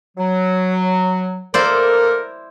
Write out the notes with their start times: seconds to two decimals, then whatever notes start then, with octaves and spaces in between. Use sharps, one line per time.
0.17 F#3
1.54 A#3 E4 A4 A#4 C5 D5